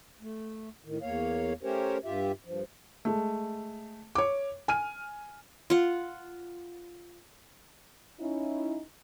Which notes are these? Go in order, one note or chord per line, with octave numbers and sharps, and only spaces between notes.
A3
A2 D#3
E2 A#3 C#5 F5
A3 C#4 G4 A#4 C5 C#5
G2 F4 G4 E5
G2 F3
G#3 A3
C#5 D6
G#5 F6 D#7
F4 F#5
C#4 D#4 E4